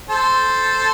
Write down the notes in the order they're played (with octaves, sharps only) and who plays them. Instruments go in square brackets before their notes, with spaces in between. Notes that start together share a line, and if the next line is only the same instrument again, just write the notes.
[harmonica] A4 C5